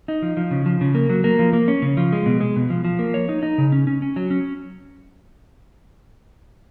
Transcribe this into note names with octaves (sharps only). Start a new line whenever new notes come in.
D#4
F3
F3
C#3
F3
C#3
A#3
F#3
A#3
F3
A#3
C#4
C#3
F3
G#3
B2
G#3
B2
F3
F3
A#3
C#5
D#4
D#4
C#3
C#4
C#4
C#4
F#3
C#4